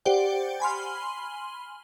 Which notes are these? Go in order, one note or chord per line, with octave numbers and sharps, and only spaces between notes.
G4 C5 D5 F#5 G5
G#5 B5 C6 F6